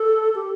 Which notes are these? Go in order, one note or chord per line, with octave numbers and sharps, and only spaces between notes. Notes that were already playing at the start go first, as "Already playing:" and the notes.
Already playing: A4
G4